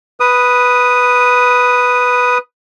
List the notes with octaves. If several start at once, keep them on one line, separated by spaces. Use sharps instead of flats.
B4 D#6